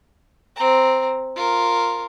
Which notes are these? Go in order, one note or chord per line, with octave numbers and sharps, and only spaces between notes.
C4 A#5
F4 A#4